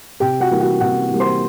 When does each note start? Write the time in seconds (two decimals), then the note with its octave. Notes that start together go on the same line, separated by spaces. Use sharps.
0.20 C3 G4 G5
0.40 F#4 F#5
0.50 E3 G3 A#3
0.60 F#4 F#5
0.80 C3 F#4 F#5
1.10 E3 G3 A#3
1.20 C5 C6